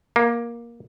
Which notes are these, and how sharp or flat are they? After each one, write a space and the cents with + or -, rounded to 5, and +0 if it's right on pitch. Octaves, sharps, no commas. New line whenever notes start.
A#3 +15